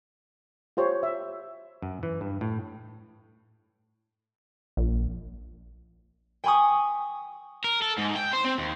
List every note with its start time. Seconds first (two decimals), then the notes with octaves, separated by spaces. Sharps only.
0.77 F4 G4 C5 C#5
1.03 E5
1.82 F#2
2.03 E3
2.21 G2
2.41 A2
4.77 A#1
6.44 G5 G#5 B5 C#6 D#6
7.64 A#4
7.82 A4
7.98 G#2
8.15 G5
8.33 C5
8.45 C4
8.58 D#2